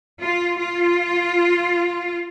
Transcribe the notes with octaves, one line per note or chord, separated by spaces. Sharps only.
F4
F4